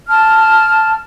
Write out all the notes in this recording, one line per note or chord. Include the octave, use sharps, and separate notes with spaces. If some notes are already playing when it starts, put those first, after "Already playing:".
A5 F6